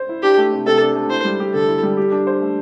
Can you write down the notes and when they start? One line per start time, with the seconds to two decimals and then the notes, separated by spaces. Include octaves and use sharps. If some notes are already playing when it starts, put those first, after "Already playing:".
Already playing: C5
0.09 E4
0.23 D4 G4
0.37 A3
0.52 C3
0.66 C3 A4
0.81 D4
0.95 A3
1.10 E4 C5
1.25 G3
1.40 G4
1.54 D3 A4
1.68 E4
1.83 G3
1.97 G4
2.11 D4
2.27 C5
2.41 A3